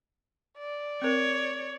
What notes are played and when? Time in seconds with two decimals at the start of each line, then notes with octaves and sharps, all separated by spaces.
0.59 D5
1.02 C4 A#4 C#5